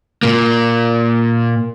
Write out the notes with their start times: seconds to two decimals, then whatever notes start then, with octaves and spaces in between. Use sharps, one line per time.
0.23 A#2 A#3